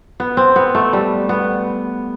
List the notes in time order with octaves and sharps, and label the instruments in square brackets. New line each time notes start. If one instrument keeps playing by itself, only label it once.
[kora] B3
C4
B3
A3
G3
B3